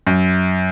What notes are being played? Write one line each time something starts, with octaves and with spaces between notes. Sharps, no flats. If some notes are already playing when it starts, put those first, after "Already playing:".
F#2